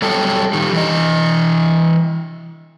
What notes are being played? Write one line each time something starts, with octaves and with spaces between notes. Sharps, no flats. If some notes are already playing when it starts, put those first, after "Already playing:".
F#3 G3 A4 G5 A5
D#3 G3
E3 D#5